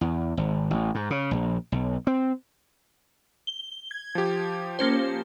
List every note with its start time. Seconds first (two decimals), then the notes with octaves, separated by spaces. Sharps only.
0.01 E2
0.37 G#1
0.71 A1
0.95 G#2
1.10 C#3
1.31 A#1
1.72 B1
2.07 C4
3.47 G7
3.91 G#6
4.15 F3 G4
4.79 A#3 C#4 C5